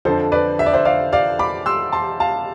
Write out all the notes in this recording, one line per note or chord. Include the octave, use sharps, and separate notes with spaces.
F2 D3 F3 A4 C5
B4 D5
E5
D5
C5 E5
D5 F5
D5 F5
B5 D6
C6 E6
A5 C6
F5 A5